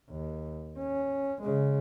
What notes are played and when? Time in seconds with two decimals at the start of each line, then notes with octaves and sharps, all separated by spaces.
0.10 D#2
0.78 C#4
1.42 C#3 G#3